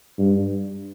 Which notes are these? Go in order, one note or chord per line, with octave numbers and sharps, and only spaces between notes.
G2